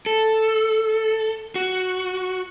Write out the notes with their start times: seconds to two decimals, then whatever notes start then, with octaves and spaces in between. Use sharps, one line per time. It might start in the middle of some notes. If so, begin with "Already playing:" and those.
0.06 A4
1.55 F#4